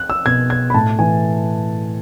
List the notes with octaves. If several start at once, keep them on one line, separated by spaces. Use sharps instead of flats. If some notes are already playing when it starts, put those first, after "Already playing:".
Already playing: F#6
E6
B2 G#6
G#6
B5
A2 A5
E3 G#5